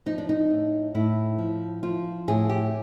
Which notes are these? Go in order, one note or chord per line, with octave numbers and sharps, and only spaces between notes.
F3 D#4
D4
D#4
A2
A2 E4
F3
F3 F4
A2 G#4
G4